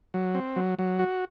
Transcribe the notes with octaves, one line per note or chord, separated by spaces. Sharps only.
F#3
C4
F#3
F#3
F#4